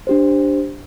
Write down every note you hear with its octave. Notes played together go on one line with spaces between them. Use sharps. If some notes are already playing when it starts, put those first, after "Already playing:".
D4 G4 C5